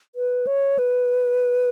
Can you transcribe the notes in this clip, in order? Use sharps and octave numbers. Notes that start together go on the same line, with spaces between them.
B4
C#5
B4